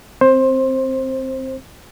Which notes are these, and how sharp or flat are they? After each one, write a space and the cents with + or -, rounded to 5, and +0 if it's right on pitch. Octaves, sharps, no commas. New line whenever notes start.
C4 +0 C5 +15